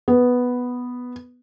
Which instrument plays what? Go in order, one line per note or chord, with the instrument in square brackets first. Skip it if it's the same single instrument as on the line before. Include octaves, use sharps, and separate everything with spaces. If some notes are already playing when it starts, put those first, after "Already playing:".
[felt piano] B3